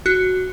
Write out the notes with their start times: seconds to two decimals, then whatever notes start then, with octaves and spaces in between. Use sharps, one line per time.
0.06 F#4